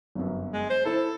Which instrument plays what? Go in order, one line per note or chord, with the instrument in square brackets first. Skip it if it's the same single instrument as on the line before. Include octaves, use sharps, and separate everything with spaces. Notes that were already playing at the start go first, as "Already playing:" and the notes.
[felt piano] G1 F#2
[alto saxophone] G#3
C5
[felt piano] E4 C5 [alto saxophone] A4